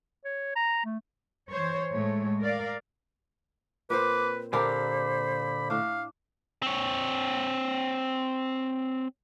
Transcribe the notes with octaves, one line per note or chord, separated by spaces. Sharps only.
C#5
A#5
A3
E3 C5 C#5
A2 G#3 A3 C#5
A#4 D5 F5
A#2 C4 B4 C5 D6
A#2 D3 G4 A#4 C5 B5
A2 D4 F5
C4 C#5